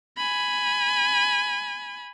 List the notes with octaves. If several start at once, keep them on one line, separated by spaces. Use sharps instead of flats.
G#5 B5